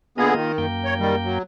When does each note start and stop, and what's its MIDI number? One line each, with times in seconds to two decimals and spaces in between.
0.18 0.34 50
0.18 0.52 58
0.18 0.34 59
0.18 0.52 65
0.18 0.34 68
0.18 0.52 75
0.36 0.66 51
0.58 1.38 42
0.58 1.38 58
0.58 1.38 79
0.85 0.94 73
0.99 1.15 51
0.99 1.15 55
1.24 1.42 54